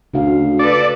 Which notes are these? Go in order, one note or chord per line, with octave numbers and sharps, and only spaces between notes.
D2 C#3 F#4 F5
A4 B4 D5